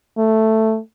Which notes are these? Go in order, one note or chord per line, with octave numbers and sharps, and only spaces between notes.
A3